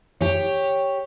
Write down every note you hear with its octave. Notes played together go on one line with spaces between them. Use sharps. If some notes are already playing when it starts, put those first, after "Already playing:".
G4 C#5